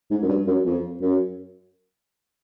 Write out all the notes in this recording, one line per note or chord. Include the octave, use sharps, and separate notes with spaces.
G#2
F#2
G2
F#2
F2
F#2